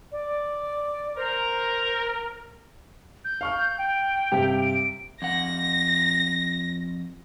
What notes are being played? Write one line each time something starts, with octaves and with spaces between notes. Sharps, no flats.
D5
A#4 C5
G6
F5 C#6 F6
G5
G2 C3 G4
D7
F2 F#5 A#6